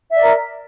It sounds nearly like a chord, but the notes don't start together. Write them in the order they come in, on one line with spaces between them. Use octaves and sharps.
E5 D5 A#4